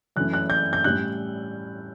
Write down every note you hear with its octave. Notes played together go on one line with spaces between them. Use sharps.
F#2 E3 A3 C#4 F#6
F#6
G6
G6
A2 G3 C#4 F#6